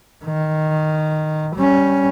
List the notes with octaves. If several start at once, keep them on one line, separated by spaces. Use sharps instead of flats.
D#3
G3 C#4